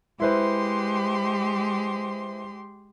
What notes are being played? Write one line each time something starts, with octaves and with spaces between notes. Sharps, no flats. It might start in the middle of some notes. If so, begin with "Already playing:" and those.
G#3 E4 G4 B4 C5 C6